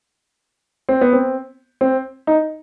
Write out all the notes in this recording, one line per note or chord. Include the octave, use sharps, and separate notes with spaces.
C4
B3
C4
C4
D#4